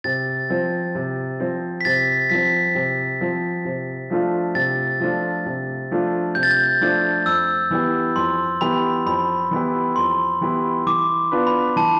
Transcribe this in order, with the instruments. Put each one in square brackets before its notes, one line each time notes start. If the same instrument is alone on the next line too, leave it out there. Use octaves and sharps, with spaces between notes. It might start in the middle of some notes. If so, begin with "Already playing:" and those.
[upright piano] C3 [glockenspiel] A6
[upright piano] F3 C4
C3
F3 C4
[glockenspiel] B6
[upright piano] C3 [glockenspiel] A6
[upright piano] F3 C4 [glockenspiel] B6
[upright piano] C3
F3 C4
C3
F3 A3 D4 F4
[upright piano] C3 [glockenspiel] A6
[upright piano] F3 A3 D4 F4
C3
F3 A3 D4 F4
[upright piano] C3 [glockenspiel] G6
[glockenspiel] A6
G6
[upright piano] F3 A3 D4 F4
[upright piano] F2 [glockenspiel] E6
[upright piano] E3 B3 E4 G4
[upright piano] F2 [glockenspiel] C6
[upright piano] E3 B3 E4 G4 [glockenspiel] B5
[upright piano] F2 [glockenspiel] B5
[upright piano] E3 B3 E4 G4
[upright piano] F2 [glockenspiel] C6
[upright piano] E3 B3 E4 G4
[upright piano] E3 [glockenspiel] D6
[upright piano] B3 D4 F4 B4
[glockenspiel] B5
[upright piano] E3 [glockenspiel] A5